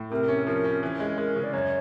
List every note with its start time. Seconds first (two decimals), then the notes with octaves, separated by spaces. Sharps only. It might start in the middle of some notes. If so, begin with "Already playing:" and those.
Already playing: A2
0.11 C3 A#4
0.28 C#4
0.47 F3 A#4
0.65 C#4
0.83 E3
1.00 G#3
1.18 G#3 A#4
1.36 C#3
1.44 D5
1.53 F#2 C#5